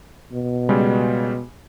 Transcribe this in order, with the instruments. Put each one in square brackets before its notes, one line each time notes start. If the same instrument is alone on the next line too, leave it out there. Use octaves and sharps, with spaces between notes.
[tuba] B2
[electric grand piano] C#3 G3 G#3